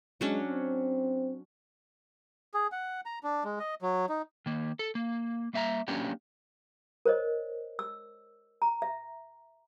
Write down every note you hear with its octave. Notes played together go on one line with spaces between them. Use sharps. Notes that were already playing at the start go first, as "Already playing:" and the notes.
F#3 G#3 C#4 D4
C4
G#4
F#5
A#5
D4
G#3
D#5
F#3
D#4
D#3 A#3
A4
A#3
G3 A#3 E5 F#5 A#5
F#3 A#3 C#4 D4 G4
A#4 C5 C#5 D#5
E6
A#5
E5